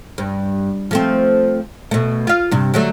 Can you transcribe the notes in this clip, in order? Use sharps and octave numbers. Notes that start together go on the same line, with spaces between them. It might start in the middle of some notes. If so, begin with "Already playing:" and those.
G2
F3 A3 C4
B2 A3
F4 F5
G2 C3
D3 F#3 A3